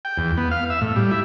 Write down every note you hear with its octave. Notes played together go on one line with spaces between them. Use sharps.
G5
E2
B3
F5
E5
A2
G3
E4